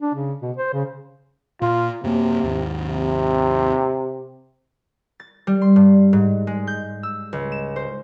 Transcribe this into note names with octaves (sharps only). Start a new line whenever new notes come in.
D4
C#3
B2
C5
C#3
A#2 F4
F#2 C3 A#3
D#2 G#2 D#3
C3
A6
G3
C6
G2
G#2
G#3
G6
E6
C#2
E7
C5